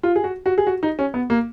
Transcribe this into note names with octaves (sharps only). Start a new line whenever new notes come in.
F4
G#4
F#4
F#4
G#4
F#4
D#4
C#4
B3
A#3